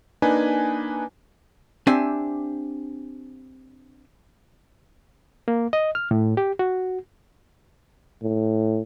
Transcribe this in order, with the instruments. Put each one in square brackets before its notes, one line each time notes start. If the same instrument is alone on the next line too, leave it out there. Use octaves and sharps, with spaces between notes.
[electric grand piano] A#3 D4 D#4 B4 G#5
[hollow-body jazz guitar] C4 D4 G4 E5 G#5
[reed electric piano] A#3
D#5
F6
A2
G4
F#4
[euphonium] A2